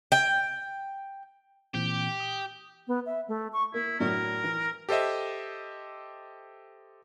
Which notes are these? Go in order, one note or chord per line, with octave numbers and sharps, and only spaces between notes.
G5
A#2 E3 C4 G4
D#6
B3
E5
A3
C#6
A#3 E4
A2 F#3 D4 A#4
E3
G4 A4 C5 D#5 E5